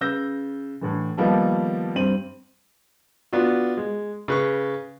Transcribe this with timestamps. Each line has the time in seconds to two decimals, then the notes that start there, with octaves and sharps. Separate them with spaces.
0.01 C#3 B4 E6 G6 A#6
0.81 A2 D3 E3
1.17 D#3 F3 G3 A#3 B3 A4
1.96 G2 C4 D#7 F#7
3.33 B3 D4 F4 F#4
3.77 G#3
4.28 C#3 B4 C#6